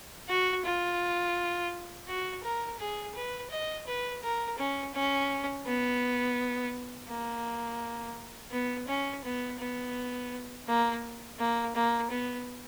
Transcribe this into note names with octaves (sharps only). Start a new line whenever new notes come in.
F#4
F4
F#4
A#4
G#4
B4
D#5
B4
A#4
C#4
C#4
B3
A#3
B3
C#4
B3
B3
A#3
A#3
A#3
B3